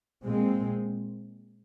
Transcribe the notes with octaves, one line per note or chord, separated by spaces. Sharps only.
A#2 G#3 C4